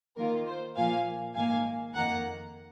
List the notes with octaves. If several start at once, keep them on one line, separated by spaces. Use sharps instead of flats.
D#3 A#3 F4 A#4
C5
A#2 F3 A#3 F4 F5 G#5
G#2 D#3 A#3 F5 G#5
F2 D#3 A#3 F#5 A#5